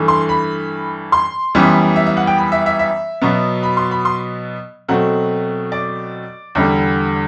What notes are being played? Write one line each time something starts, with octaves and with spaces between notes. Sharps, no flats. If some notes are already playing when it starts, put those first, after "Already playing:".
Already playing: G2 E3 A3
C6
B5
C6
F#2 E3 G3 B3
E5
E5
F#5
G5
B5
E5
E5
E5
B2 F#3 B3
B5
C6
B5
C6
B2 F#3 A3 C4 F#5
D5
E2 D3 G3